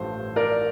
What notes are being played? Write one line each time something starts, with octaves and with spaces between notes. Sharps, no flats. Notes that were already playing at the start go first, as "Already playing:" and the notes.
Already playing: A1 G2 F3 A3 C5
A#4 D5